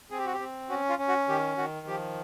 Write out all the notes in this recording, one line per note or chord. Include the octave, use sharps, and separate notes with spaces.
C4 G#4
G4
F#4
G4
C4
C#4 F#4
F4
C#4
F#4
D#3 G4
D#3 F#4
F3 G4